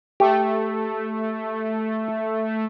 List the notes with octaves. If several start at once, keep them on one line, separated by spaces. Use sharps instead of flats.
A3 G4